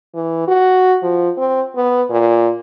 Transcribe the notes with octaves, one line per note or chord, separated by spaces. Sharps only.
E3
F#4
F3
C4
B3
A#2